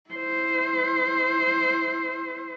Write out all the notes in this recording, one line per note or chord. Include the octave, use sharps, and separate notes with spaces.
E4 C5